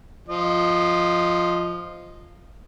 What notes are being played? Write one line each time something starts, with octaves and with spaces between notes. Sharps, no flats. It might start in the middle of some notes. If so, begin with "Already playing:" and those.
F3 D#5